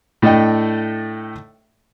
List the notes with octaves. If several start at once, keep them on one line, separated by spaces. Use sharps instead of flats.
A2 A3 D4 A4 D#5 G5